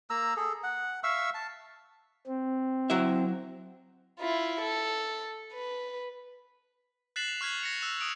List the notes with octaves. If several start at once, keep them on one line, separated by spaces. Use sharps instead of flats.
A#3 A#5 E6
G#4 A4
F#5
E5 F5 C#6 E6
A5
C4
F#3 E4 E5
E4 F4
A4
B4
F#6 A6 B6 C7 E7 F#7
F7
C#6 F6 F#6 G#6 B6 F#7
A#6 C#7 F7
E6 F#6 E7 F7
D#6 D7 F7